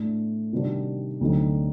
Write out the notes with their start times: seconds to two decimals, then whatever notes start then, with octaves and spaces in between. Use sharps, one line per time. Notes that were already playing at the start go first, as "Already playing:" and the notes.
Already playing: A2 A3 D4
0.53 C3 D#3 G3 D4 F#4
1.21 D2 D3 F#3 C4 D#4